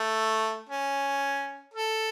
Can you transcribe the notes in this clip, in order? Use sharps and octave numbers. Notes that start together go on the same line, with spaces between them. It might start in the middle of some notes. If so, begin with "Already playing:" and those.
Already playing: A3
C#4
A4